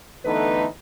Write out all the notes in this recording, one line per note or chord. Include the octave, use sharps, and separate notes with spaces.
D3 E3 A3 B3 D#4 B4